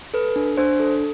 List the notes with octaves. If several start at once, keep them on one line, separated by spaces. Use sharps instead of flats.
A4 B4
D4
D4 C5
A4